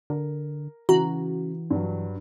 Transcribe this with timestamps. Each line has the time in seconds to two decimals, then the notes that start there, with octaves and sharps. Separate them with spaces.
0.10 D3 A#4
0.89 C#3 E3 F#4 A#5
1.70 G2 F#3